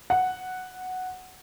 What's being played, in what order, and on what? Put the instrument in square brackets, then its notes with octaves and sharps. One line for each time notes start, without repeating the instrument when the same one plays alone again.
[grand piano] F#5